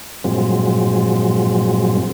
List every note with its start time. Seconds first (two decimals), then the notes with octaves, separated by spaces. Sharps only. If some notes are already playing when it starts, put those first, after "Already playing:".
0.24 G2 A#2 F3 F#3 G#3 C4